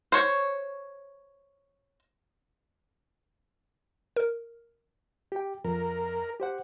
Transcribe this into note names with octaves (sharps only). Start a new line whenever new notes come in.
C5 C#5
A#4
G4 G5
F2 A#4
G4 C5 F#5